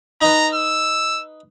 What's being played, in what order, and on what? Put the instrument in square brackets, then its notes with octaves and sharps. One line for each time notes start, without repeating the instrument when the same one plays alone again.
[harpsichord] D#4 B4 [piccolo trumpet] A#5
[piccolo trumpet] E6